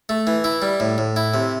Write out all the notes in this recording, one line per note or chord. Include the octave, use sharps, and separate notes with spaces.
A3
E3
E4
G3
A2
A2
E4
C3